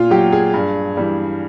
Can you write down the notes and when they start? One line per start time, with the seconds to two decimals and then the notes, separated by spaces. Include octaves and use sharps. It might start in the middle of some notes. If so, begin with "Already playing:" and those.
Already playing: A#2 F4
0.10 F#3 G4
0.32 G#4
0.53 G2
0.97 E3 G3